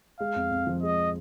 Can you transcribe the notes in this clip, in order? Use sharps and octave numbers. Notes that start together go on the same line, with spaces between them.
G#3 F5
F2
F2
F3
G#3 D#5